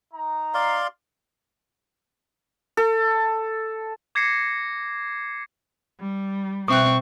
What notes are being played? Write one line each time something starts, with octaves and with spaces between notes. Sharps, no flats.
D#4 A#5
D5 F5 C6
A4
D6 G#6 A#6 C7 C#7
G3
B2 C4 E5 C#6 F#6